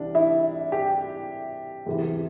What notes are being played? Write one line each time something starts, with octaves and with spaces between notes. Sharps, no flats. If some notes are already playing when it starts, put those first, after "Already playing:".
Already playing: C2 C3 E3 D4
E4
G4
E2 C3 E3